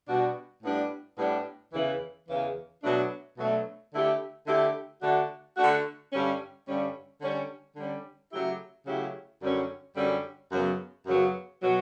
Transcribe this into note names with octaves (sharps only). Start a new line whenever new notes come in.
B2 G3 D4 F#4
A2 G3 B3 D4 G4
A2 G3 B3 D4 G4
E2 C#3 E3
E2 C#3 E3
B2 F#3 A3 D4
B2 F#3 A3 D4
D3 A3 E4 G4
D3 A3 E4 G4
D3 A3 D4 F#4
D3 A3 D4 F#4
G2 D3 G3 C#4
G2 D3 G3 C#4
D3 G3 C#4
D3 G3 C#4
C#3 F#3 A3 E4 G4
C#3 F#3 A3 E4 G4
F#2 D3 G3 C#4
F#2 D3 G3 C#4
F#2 C#3 F#3 B3
F#2 C#3 F#3 B3
B2 F#3